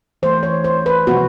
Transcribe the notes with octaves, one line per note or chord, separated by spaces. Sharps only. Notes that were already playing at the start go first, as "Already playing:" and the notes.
E3 A3 C5
C#5
C5
B4
C3 F3 G#3 B3 F#4